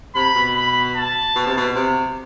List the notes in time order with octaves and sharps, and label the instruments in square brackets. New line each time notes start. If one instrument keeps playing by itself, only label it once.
[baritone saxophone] C3 [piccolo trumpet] B5
[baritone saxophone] B2
[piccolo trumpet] B5
A5
[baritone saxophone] B2
C3
B2
C3